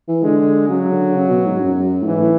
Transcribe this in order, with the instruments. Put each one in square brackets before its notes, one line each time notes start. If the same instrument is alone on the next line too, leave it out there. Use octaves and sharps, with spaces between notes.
[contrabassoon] E3
[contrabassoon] D3 [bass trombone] G#3
[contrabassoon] C#3 [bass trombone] F#3
[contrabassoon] D3
C#3
B2
G#2
F#2
A2
[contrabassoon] G#2 [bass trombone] E3
[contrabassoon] A2